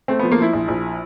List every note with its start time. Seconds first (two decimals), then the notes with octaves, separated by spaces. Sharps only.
0.08 A3 C4
0.19 F3 B3
0.32 A#3
0.38 F3 E4
0.53 A#1
0.68 A#1